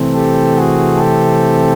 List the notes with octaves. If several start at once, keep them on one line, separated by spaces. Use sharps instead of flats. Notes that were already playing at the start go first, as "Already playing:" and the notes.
Already playing: C3 E3 A3 C4
G4 A4
F#4 G#4
G4 A4